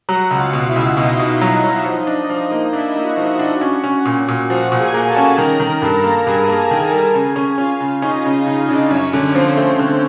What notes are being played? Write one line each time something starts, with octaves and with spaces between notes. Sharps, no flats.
F#3 F#4 F#5
C#2
F4 F5
B2
E4 E5
C#2
B2 D#4 D#5
B2
F#3
F#3
F3
D4
F3
A#3
D4 E4 E5
A#3
F#4 F#5
F3
F#4 F#5
D4
C#4
C#4
A#2
A#2
F3 F#4 F#5
A#2
G#4 G#5
A#3
A4 A5
C#4
D#3 A#4 A#5
D#3
G2 A4 A5
A#3
G2 G#4 G#5
A#3
G#4 G#5
D#3
A4 A5
G3
C#3 G#4 G#5
C#4
C#4 F4 F5
C#3
C#4 D#4 D#5
C#3 D#4 D#5
C#3 D#4 D#5
C#3 D4 D5
F#2 C#4 C#5
D3
F3 C4 C5
A3
D3